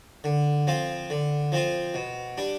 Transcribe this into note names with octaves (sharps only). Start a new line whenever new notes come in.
D3
F3 C4 F4
D3
F3 C4 F4
B2
G3 D4